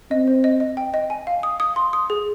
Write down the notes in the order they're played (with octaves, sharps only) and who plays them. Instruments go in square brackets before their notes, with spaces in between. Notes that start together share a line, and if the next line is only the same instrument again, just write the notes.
[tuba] C4 [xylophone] D#5
[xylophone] C5
D#5
D#5
G5
D#5
G#5
F5
D#6
D#6
C6
D#6
G#4